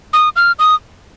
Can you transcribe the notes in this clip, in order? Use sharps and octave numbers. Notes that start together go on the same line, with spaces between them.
D#6
F6
D#6